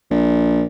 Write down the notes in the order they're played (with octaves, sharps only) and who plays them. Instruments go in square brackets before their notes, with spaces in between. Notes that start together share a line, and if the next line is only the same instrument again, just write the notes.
[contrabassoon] A#1